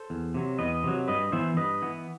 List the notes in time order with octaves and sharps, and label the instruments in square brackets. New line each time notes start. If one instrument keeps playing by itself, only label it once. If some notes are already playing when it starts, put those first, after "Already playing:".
Already playing: [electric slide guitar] A4 C5
E2
C3 F#3
E2 B4 D#5
C3 F#3
G2 B4 D#5
E3 B3 C5 E5
G2 B4 D#5
E3 B3